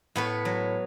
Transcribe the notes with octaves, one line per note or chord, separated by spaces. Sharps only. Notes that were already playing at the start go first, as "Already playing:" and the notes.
A2 B3 B4
F#3